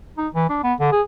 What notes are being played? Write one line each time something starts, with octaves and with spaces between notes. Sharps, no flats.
D#4
E3
D4
B3
D3
G#4